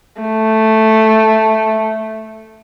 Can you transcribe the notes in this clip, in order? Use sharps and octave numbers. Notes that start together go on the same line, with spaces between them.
A3